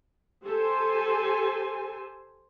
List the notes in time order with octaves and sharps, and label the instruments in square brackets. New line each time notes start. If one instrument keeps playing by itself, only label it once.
[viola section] G4 A4 C5 G#5